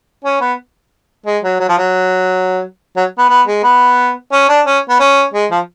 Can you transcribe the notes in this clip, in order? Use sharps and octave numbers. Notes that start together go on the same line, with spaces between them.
C#4
B3
G#3
F#3
F#3
F3
F#3
F#3
B3
B3
G#3
B3
C#4
D4
C#4
B3
C#4
G#3
F3